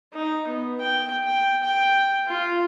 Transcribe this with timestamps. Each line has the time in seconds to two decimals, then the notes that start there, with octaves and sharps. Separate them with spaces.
0.14 D#4
0.48 B3
0.80 G5
1.23 G5
1.63 G5
2.28 F4